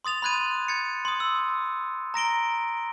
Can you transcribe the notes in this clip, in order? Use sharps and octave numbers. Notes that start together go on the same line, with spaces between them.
C6 D#6 A6 F7
B5 C6 F#6 G#6 D#7
G#6 A6 C#7
C6 D#6
E6
A#5 A#6 D7 G7